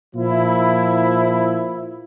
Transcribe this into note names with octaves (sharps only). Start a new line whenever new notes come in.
A#2 F3 E4